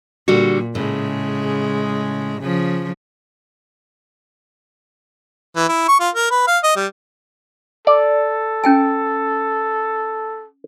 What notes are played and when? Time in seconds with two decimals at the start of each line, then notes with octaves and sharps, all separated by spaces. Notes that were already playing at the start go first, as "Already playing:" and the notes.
0.28 A#2 D3 G3 F#4
0.75 A2 C#3 G#3
2.41 C#3 F3
5.56 E3
5.69 E4
5.88 C#6
6.00 F4
6.15 A#4
6.31 B4
6.47 F5
6.63 D#5
6.76 G3
7.87 A4 D5
8.64 C#4 G5 G#5